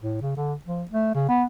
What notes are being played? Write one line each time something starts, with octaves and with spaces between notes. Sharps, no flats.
A2
C#3
D3
F3
A3
C#3
B3